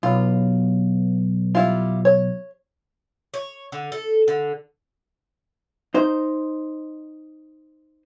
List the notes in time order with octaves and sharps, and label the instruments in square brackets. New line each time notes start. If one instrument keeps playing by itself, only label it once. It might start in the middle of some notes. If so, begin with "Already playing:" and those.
[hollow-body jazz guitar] B1 [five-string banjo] F4
[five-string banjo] G3 E4 F4
C#5
[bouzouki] C#5
D3
A4
D3
[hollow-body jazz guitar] D#4 C5